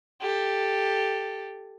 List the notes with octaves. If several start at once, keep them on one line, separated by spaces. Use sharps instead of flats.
G4 A4